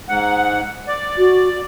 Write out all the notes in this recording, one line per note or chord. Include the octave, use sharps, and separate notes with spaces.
G#2 F#5
D5
F#4